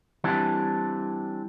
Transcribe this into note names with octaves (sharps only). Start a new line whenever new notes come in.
E3 G3 C4 D4